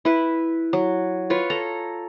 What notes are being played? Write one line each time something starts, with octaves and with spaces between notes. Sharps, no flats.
E4 B4
F#3
F4 B4 C#5
A4 A#5